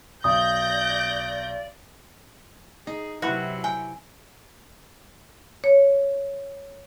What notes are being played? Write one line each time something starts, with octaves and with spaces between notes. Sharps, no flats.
B1 D5 D#6 G6 A#6
D#4 G#4
C3 F#3 E4 F#4 B4 B5
G5 G#5
C#5